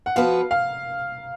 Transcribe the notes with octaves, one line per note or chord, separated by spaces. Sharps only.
F#5
F3 B3 F#4 B4 F5
F5